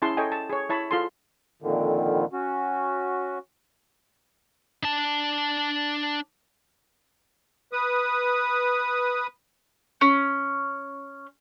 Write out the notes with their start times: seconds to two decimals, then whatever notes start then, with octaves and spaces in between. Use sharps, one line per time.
0.02 C#4 E4 G#4 A5 C6
0.17 A4 C#5 D#5 G5 G#5
0.32 A5
0.50 G#4 C#5
0.69 E4 C#5 A5 B5
0.91 F4 G#4 A4 A5 C6
1.62 F2 A#2 D3 D#3
2.33 C#4 F#4
4.83 D4 A5
7.73 B4 D#6
10.01 C#4